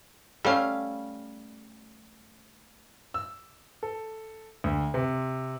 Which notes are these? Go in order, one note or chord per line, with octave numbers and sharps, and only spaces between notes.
G3 A3 C#4 F5
E6
A4
D2
C3